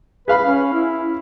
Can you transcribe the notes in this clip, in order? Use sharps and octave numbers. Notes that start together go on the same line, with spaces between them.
G#4 B4 F5 B5
C#4
E4